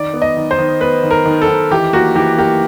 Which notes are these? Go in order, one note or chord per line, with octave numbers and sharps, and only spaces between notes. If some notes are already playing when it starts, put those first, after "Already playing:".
Already playing: D#3 D5
B3
D#5
D#3
C5
D#3
B3 B4
D#3
A#4
D#3
A4
D#3
E3 G4
A#3 F#4
E3 G4
A#3 G4